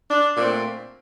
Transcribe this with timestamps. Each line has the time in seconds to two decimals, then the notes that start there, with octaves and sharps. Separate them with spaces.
0.11 D4
0.37 A#2 A3 C4 D4